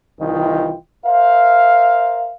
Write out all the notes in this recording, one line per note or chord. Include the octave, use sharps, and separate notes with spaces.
C2 D#3 E3 F4 D#5 G5
A#4 C5 E5 F5